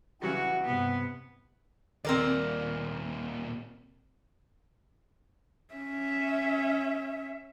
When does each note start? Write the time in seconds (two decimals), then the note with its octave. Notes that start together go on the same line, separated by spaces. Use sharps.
0.22 C#3 E3 F#3 G3 F#4 F#5
0.65 G2 C3 B3
2.05 D#2 A#2 C4 A#4 D5
5.74 C#4 E5